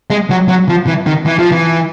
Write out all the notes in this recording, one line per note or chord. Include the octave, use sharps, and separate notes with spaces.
G#3
F#3
F#3
F3
E3
D#3
E3
F3
E3